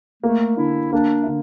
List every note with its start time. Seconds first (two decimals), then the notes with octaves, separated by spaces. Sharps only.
0.23 A3 A#3
0.57 D3 E4
0.93 A#3 D4
1.22 E4
1.27 D3